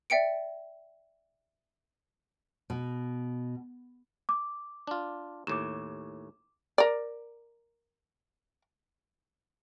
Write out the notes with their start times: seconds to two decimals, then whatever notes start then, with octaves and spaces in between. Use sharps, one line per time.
0.10 D5 E5 G5 C#7 D7
2.70 B2
4.29 D6
4.87 D4 F4
5.47 D#2 A2 D6 E7
6.78 A#4 D5